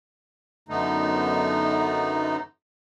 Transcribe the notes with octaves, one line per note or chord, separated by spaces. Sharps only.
F#2 D3 A3 B3 D#4